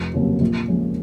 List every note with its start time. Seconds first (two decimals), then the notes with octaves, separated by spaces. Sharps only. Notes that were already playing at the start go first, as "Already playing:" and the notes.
Already playing: F1
0.14 D#2 C#3 F#3 C4
0.41 A#1
0.68 A#2 F3 G#3 C#4